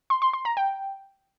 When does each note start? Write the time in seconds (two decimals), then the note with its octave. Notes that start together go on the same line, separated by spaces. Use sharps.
0.10 C6
0.22 C6
0.33 C6
0.45 A#5
0.57 G5